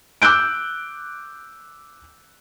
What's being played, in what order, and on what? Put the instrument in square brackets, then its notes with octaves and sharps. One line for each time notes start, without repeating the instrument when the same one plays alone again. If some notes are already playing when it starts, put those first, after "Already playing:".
[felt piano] D6 E6 F#6 G6 D7